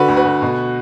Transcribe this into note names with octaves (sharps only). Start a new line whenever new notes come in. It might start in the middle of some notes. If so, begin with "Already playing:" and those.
Already playing: D3 F#4 B4
D2
F#4 B4
D2
B2